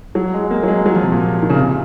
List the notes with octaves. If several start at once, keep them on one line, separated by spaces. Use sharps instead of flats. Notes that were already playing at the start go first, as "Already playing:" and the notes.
F#3
G#3
A#3
F#3
G#3
F#3
F3
C3
A#2
D#3
C#3
C3